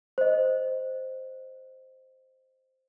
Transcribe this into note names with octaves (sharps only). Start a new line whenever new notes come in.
C5 D#5